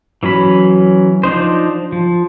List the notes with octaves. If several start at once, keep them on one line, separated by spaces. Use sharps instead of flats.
E3 F#3 C#4 B5
F3 D4 D#4 C5
F3